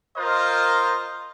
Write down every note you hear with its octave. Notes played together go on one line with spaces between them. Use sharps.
F4 A#4 C5 D#5